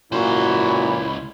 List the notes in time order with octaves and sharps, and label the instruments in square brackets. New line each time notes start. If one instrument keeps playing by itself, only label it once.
[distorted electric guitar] C#2 C5 [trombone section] F#2 A#2 [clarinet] E4 [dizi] F#4